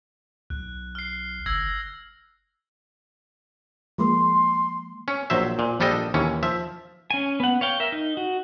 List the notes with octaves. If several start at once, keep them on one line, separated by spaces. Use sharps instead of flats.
B1 F#6
F6 C7
G1 E6 G#6 A#6
F3 G#3 A#3 C6
C#4
A#1 F#3 C5 E5
A#2
A#1 G3 D4 A4 D#5
D#2 E3 C#4
F3 E5
C#4 G#5
B3 F#5
C#5 F5 G5
A#4 E5
D#4
F#4